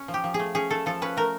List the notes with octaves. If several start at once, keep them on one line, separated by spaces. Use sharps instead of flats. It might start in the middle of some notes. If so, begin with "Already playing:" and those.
Already playing: C#4
F3
G4
F3
G#4
A3
C#4 G#4
A3 A4
F3 A4
C#4 B4
A3 A#4